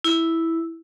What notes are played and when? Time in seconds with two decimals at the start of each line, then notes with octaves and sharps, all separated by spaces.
0.04 E4